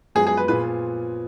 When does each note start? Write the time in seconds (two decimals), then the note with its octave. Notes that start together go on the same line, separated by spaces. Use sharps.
0.15 F#2 F3 G#3 B3 F#4 G#4
0.27 G#4
0.37 B4
0.48 A#2 F3 B3 F4 G#4 B4